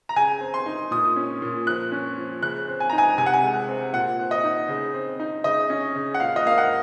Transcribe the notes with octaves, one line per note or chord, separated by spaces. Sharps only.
A#5
C#3 G#5
C4
C6
D#4
A#2 D#6
C#4
A#2
F3 F#6
C#4
F3
C#3 F#6
C4
G#5
D#4 A#5
G#5
C3 G#5
F#5
G#5
G#3
C4
A#2 F#5
C4
D#5
D#4
C#3
C4
D#4
C#3 D#5
C#4
C#3
F#5
A#2 F5
D#5
A#3 F5
F#5